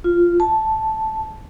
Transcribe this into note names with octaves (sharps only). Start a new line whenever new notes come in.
F4
A5